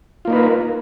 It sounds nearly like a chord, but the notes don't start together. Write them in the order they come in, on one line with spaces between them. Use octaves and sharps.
F4 A#3 D#4 B4 A#4